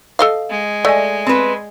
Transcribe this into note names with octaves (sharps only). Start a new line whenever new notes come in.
A4 D#5 F5
G#3
A3 D5 D#5 G#5
C4 B4